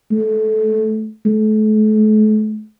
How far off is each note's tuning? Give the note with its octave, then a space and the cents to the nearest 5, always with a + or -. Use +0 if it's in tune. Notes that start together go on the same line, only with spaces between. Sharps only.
A3 -15
A3 -40